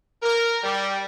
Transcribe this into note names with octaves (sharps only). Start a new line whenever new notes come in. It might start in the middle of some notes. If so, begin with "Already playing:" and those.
A#4
G3